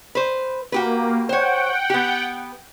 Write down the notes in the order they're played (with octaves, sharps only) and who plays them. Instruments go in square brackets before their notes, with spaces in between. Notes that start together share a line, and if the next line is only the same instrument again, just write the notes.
[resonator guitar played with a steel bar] B4 C5
[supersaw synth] A#3 [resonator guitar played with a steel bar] F#4 G4 B4
[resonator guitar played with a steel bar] C5 C#5 [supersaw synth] F#5 G5
[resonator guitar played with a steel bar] B3 G4